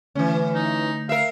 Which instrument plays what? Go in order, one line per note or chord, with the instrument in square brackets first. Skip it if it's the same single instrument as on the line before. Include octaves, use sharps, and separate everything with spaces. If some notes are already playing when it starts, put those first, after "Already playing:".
[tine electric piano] D3 A3 [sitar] E3 C#4
[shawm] D#4
[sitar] A#4 E5 [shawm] F5